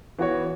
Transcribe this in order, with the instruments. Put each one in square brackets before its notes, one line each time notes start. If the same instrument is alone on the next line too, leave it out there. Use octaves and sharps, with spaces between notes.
[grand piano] E3 B3 F#4 C#5